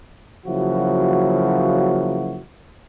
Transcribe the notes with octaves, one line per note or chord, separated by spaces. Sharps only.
C#3 F3 F#3 A#3 E4 F#4